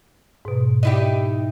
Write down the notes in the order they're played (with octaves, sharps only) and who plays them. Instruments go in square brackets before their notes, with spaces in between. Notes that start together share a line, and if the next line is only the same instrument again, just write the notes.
[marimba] G#2 B2
[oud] D#4 E4 G4